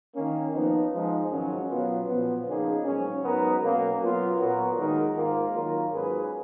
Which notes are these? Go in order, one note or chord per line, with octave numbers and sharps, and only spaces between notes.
D#3 A#3 C#4
F3 B3 D#4
F3 G#3 D#4
G#2 D#3 F#3 C#4
B2 F#3 B3 F4
A#2 F3 B3
C#3 F3 A#3 D#4 G#4
G#2 F#3 C#4
G#2 F#3 B3 D#4 A#4
B2 F#3 A#3 C#4
F#3 B3 F4 A#4
A#2 F#3 B3 F#4 A#4
D#3 G#3 D#4 A#4
G#2 D#3 A#3 F4 A#4
D#3 F#3 A#3 F4 A#4
G#2 F#3 C#4 G#4 B4